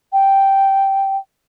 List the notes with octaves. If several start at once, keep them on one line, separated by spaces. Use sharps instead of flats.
G5